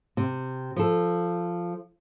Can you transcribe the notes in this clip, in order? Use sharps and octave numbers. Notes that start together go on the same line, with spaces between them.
C3
F3 A4